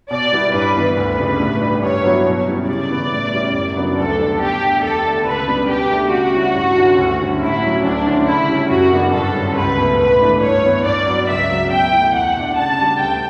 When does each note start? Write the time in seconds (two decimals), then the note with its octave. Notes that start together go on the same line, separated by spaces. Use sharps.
0.11 B2 D5
0.32 G3 B3 E4
0.54 G2 B4
0.75 E3 B3 D4
0.97 D2 B4
1.18 C#3 G3 D4
1.40 A2
1.61 G3 D4
1.83 G2 C#5
2.04 F#3 B3 E4
2.26 B2
2.47 G3 C#4 E4
2.68 C#3 D5
2.90 E3 B3 E4
3.11 A2
3.33 G3 C#4 E4
3.54 F#2
3.76 C#3 F#3 B3 D4
3.98 D2 A4
4.19 D3 G3 D4
4.41 B2 G4
4.62 A3 D4
4.83 E2 A4
5.05 D3 A3 D4
5.26 C#2 B4
5.48 C#3 G3 B3 D4
5.70 B2 G4
5.91 A3 D4
6.12 C#3 F#4
6.34 G3 C#4 E4
6.55 G2
6.77 D3 G3 C#4 E4
6.98 D2
7.20 D3 G3 C#4
7.41 A2 E4
7.63 F#3 C#4
7.84 D2 D4
8.06 D3 A3 C#4 E4
8.27 C#3 E4
8.49 G3 C#4
8.70 F#2 F#4
8.92 C#3 E3 B3 D4
9.13 G2 A4
9.35 D3 G3 C#4
9.56 C#2 B4
9.78 B2 A3
9.99 A2 B4
10.21 E3 A3 D4
10.42 G2 C#5
10.64 E3 B3
10.85 G2 D5
11.06 F#3 B3
11.28 C#2 E5
11.50 C#3 F#3
11.71 B2 G5
11.92 A3 E4
12.14 E2 F#5
12.35 B2 A3 D4
12.57 C#3 A5
12.79 G3 D4
12.99 D2 G5